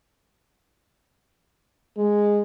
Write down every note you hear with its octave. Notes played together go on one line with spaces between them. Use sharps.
G#3